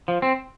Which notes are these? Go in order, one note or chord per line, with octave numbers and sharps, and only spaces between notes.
F3
C4